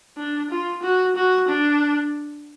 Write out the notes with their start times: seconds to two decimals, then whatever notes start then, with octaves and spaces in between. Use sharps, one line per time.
0.17 D4
0.50 F4
0.83 F#4
1.16 F#4
1.48 D4